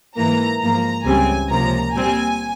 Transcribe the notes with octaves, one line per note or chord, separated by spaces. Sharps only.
G#2 E3 A#3 A#5
G#2 F3 A#3 A#5
C#2 C#3 E3 G3 C4 G#5
C#2 C3 F3 A#3 A#5
A#2 G3 C4 G#5